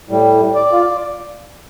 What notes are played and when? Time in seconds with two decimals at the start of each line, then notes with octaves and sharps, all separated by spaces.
0.09 A2 G3
0.55 D5
0.72 F4